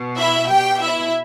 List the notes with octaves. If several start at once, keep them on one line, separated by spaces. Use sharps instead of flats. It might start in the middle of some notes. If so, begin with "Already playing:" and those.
Already playing: B2
E4 E5
B2 G4 G5
E4 E5